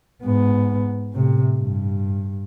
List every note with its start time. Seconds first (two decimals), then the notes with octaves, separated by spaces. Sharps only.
0.23 G#2 B3
1.13 A2 C3
1.56 G2